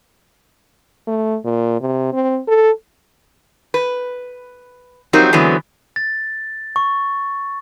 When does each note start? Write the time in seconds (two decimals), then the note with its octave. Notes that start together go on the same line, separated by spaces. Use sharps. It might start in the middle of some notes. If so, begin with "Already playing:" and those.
1.07 A3
1.45 A#2
1.81 C3
2.13 C4
2.48 A4
3.74 B4
5.13 F3 F#3 C4 D#4 G4 A#4
5.33 D3 E3 F#3 G#3 B3 C4
5.96 A6
6.76 C#6